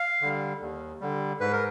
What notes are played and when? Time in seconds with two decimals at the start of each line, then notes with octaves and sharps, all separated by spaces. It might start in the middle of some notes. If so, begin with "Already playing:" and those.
Already playing: F5
0.21 D3 G3
0.61 D#2
1.01 D3 G3
1.40 G#2 B4
1.52 A#4